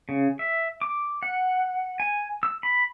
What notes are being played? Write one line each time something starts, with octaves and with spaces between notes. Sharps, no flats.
C#3
E5
D6
F#5
G#5
E6
B5